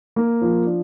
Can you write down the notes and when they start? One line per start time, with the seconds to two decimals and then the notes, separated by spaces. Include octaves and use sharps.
0.16 A#3
0.42 F3
0.66 D4